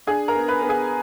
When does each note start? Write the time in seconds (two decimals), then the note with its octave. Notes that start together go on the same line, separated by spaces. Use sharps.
0.07 D4 G#4 G#5
0.28 A#4 A#5
0.35 B3
0.48 B4 B5
0.62 B3
0.69 G#4 G#5